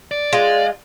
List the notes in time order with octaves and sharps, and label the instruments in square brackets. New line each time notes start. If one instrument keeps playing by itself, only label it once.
[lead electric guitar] D5
[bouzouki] G#3 F4